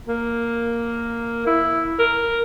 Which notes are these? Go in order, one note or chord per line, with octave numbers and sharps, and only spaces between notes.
A#3
E4
A#4